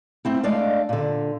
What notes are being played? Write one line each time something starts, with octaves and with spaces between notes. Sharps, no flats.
A3 C4 E4
G#3 A3 D4 D5 D#5 F5
A#2 D3